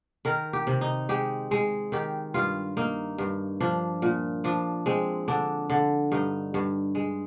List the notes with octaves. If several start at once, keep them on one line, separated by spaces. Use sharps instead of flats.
D#3 A#4
G4
C3
D#4
G#3 G4
G#3
D#3 G4
G2 F4
A#3 D#4
G2
F3 D4
A#2
F3 D4
G#3 C4
D3 D4
D3
G2 D#4
G2
G#3